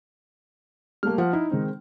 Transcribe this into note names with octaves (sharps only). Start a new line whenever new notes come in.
G3 A3 A#3 F6
F3 F#5
D#4 E4
D#3 G#3 C4